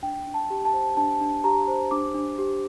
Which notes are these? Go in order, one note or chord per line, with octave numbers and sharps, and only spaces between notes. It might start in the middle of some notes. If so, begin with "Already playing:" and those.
D4 G5
D4
A5
G4
A5
C5
D4 A5
D4
G4 A#5
C5
D4 D6
D4
G4